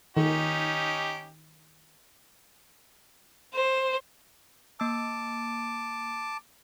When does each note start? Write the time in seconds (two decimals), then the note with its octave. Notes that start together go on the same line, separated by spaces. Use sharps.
0.17 D#3 C#4 D#4 G4
3.54 C5
4.80 A#3 A5 D6 E6